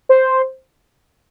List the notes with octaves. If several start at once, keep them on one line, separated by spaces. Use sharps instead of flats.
C5